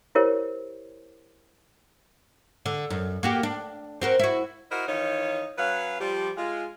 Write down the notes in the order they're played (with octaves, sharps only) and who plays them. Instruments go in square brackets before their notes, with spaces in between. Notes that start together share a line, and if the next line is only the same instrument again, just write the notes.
[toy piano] E4 G4 A#4 C5 C#5
[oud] D3
F#2
A#3 F#4 G4
D4
C4 F#4 A#4
E4 F#4
[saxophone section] E4 F#4 A#4 C5 D#5 F#5
D#3 E3 D#4 F4 C#5
F#3 C#4 B4 F5
F3 G3 G4
G#3 F4